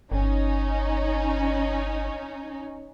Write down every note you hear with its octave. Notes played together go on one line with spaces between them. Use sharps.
G1 C#4 D#4